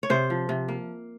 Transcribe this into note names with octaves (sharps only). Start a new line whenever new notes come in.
C#5
C3 C5
F3
C3
A#3